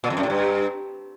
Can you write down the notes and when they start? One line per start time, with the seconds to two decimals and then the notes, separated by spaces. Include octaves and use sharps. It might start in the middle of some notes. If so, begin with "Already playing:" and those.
0.04 A#2
0.10 F2
0.17 F#2
0.23 A2
0.30 G2